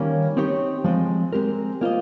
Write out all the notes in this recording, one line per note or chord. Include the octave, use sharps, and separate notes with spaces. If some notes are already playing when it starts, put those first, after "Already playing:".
Already playing: D#3 G3 A#3 C#4
C4 D#4 G4 C#5
F3 G#3 C4
G#3 C4 G4 A#4
A#3 F4 C5 D#5